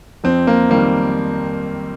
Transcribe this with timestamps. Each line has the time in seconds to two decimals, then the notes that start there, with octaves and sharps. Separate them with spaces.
0.24 F2 C4
0.47 A#3
0.70 D#3 G3 A#3